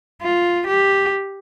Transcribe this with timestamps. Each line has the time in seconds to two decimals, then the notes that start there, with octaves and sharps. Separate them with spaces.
0.22 F4
0.67 G4